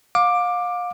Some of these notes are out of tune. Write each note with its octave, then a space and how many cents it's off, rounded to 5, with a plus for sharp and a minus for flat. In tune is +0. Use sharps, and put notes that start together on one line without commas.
F5 +30 D6 +10